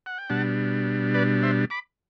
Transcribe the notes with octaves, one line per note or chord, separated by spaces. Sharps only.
F#5
G5
B2 G3 D4 F#5 A5
B4 D5
C5 E5
B5 D6